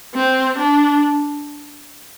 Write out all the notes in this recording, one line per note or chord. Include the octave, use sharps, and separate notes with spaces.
C4
D4